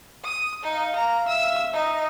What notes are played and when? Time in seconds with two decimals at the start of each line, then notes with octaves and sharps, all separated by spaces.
0.24 D#6
0.63 D#4 F5
0.95 A#5
1.28 E5 E6
1.73 D#4 D#5